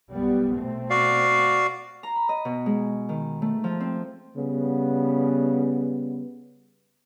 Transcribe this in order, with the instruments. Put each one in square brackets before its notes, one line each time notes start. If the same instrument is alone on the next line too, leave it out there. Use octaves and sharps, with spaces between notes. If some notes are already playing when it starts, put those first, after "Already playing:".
[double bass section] B1 G3 B3
B2 A3 C4
[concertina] F#4 D5 F5
[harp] A#5
B5
D#5
B2
G#3
D#3
A3
F3
C4
[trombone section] C#3 G3 B3